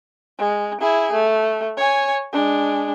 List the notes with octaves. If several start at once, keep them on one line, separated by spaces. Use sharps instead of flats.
G#3
E4 G#4
A3
C#5 G#5
G#3 D4